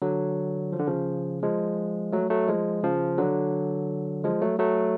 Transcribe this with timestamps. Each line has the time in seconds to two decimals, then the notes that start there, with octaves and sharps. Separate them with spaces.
0.02 D3 F#3
0.72 F3
0.79 D3
0.87 C#3 F3
1.43 F3 G#3
2.12 F#3 A3
2.30 F#3 A3
2.48 F3 G#3
2.83 C#3 F3
3.18 D3 F#3
4.24 F3 G#3
4.41 F#3 A3
4.59 F#3 A3